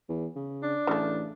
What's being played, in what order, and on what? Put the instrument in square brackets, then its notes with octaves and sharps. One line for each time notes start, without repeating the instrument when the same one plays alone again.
[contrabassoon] E2
C#3
[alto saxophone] D4
[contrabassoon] A1 [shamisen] C#3 A3